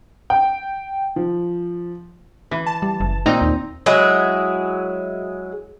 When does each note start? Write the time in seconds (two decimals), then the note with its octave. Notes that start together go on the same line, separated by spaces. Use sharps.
0.30 G5
1.16 F3
2.51 E3
2.66 A5
2.82 G3
3.00 F#1
3.26 A#2 C4 D#4 A#5
3.41 D#2
3.86 F#3 G#3 E4 G#4